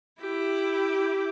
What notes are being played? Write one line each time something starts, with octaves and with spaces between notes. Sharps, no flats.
E4 G4